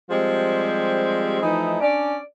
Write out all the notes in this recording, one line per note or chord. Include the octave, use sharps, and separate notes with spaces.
F3 G3 G#3 C4 G4
E3 F3 A3 D#4
C#4 D4 D5